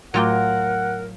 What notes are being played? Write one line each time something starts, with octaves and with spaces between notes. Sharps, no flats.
A2 F#3 A3 F4 A#4 F#5 G5 D6